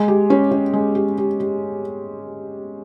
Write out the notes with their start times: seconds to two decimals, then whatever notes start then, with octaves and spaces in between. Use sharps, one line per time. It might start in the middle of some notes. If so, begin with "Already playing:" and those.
Already playing: G#3
0.08 G4
0.30 C#4
0.51 C#4
0.73 G#3
0.95 G4
1.18 G4
1.40 G4